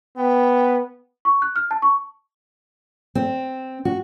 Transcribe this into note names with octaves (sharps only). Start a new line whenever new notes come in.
B3 G5
C#6
F#6
F6
A5
C#6
C4
F#4